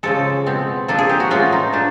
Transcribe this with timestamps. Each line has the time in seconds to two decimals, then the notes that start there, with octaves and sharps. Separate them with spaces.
0.03 C#3 F3 G#3 A4
0.46 B2 G#3 C4
0.88 F3 A#3 D4 A4
0.99 G#4
1.09 G4
1.20 F#4
1.30 A2 E3 G#3 C#4 F4
1.52 D#4
1.72 F3 A3 D4